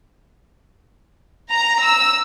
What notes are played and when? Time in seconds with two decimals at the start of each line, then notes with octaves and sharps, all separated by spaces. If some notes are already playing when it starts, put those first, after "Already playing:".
1.52 A#5
1.83 E6